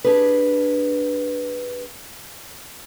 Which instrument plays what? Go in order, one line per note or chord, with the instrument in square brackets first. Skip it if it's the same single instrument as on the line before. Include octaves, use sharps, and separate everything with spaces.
[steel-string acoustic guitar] D4 G4 G#4 B4